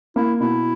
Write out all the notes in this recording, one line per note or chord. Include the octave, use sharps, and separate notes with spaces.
A#3 E4
B2 E4